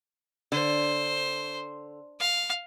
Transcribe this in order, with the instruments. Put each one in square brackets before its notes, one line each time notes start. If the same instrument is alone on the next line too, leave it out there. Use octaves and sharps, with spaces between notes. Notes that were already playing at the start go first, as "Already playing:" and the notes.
[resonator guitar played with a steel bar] D3 [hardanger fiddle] C5
[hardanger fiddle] F5